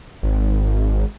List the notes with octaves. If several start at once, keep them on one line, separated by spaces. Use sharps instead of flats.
G#1